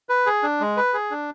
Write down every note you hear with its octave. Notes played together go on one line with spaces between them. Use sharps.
B4
G#4
D4
G#3
B4
G#4
D4